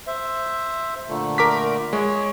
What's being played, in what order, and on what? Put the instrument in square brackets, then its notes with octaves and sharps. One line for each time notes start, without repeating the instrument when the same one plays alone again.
[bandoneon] C5 E5
A#2 D3 A3
[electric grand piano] A#4 D6 B6
[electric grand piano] G#3 [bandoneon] C#5